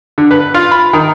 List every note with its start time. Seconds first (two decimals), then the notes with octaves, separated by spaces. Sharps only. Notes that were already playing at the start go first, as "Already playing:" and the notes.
0.18 D3
0.31 B4
0.54 F4
0.71 B5
0.93 D#3